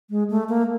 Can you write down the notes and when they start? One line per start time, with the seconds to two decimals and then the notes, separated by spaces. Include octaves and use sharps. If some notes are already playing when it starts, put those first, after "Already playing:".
0.10 G#3
0.30 A3
0.49 A#3